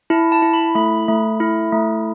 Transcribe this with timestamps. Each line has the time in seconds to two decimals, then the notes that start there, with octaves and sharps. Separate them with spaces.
0.10 E4 A5
0.32 A5
0.42 E4
0.53 B5
0.75 A3 B5
1.08 A3
1.40 E4
1.73 A3